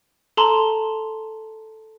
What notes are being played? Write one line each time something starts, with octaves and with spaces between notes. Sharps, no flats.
A4 A5 A#5 C6